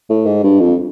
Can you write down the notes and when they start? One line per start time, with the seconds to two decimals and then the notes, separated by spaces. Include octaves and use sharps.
0.10 A2
0.26 G#2
0.43 G2
0.60 F2